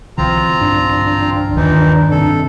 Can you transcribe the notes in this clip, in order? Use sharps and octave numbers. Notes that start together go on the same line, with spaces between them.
B1 D3 E3 C4 F4 A#5
G2 D4
D#2 A#2 D#3 E3 D#4
C3 A4